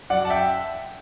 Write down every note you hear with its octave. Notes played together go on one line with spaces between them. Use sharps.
F#2 D5 F#5
A5
E5 G5